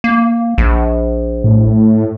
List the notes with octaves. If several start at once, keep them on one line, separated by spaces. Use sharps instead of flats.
A#3
A#1
A2